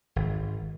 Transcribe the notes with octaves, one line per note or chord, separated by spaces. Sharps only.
G#1